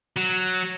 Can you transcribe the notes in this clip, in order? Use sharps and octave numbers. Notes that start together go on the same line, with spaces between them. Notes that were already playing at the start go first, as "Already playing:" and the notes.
F#3